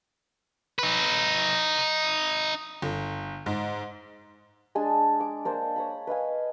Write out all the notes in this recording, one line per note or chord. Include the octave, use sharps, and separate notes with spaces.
D#4 B4
G1
G#2
G#3 D4 G#5 A5
D6
A#3 D4 C5
C#5 A#5 B5
B4 D#5 F5 G#5